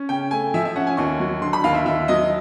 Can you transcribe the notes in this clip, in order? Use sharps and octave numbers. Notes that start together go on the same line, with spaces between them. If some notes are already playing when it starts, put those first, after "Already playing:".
Already playing: C#4
C#3 G5
A3 G#5
F3 E5
E5
C#4 F#5
G#5
D#2 C#6
F#3
D3 C6
B5
D#2 F5
E5
D#2 E5
F#3 D#5